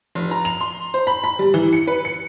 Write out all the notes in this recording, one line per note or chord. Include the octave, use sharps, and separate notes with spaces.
F1
A#5
F7
C6
C5
B5
B5
G3
E3
C#7
B4
C#7